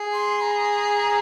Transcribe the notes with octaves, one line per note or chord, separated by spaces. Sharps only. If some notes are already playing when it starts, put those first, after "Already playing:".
Already playing: G#4
C6
A#5